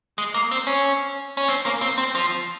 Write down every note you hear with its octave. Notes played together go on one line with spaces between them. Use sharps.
G#3
A#3
C4
C#4
C#4
C4
A#3
C4
C4
F3